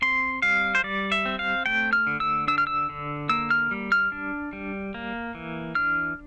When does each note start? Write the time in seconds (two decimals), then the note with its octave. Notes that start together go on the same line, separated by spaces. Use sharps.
0.02 C4 C6
0.42 G3 F5
0.75 C5
0.84 G3 D5
1.12 E5
1.25 C4
1.39 F5
1.66 A3 G5
1.93 F6
2.07 D3
2.20 E6
2.48 D4 E6
2.58 F6
2.67 E6
2.90 D3
3.29 A#3 E6
3.50 F6
3.71 G3
3.92 F6
4.12 D4
4.53 G3
4.94 A#3
5.35 E3
5.75 D4 F6